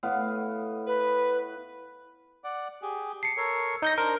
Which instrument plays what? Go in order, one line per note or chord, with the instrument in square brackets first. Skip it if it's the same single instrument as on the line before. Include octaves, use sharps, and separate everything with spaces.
[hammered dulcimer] A2 B3 F5
[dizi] B4
[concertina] D5 F#5
G4 G#4
[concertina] A5 [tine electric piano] C7 C#7
[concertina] A4 A#4 C#5
[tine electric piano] D#4 G6 A#6
[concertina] D4 C5 F6 [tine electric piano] A#4